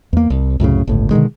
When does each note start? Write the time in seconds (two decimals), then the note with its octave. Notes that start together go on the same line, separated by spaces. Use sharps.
0.13 E2 A#3
0.30 C2
0.60 C2 F#2 A2 C#3
0.87 G1 C#2 A2
1.11 B2 D3 D#3 G#3